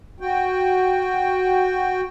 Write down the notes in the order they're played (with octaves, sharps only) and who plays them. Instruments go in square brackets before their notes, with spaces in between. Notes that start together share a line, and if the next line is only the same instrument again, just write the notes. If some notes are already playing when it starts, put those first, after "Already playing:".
[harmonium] F#4 G5